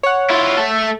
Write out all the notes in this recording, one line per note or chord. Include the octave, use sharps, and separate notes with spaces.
C#5 F#5
E4 F4
A3 A4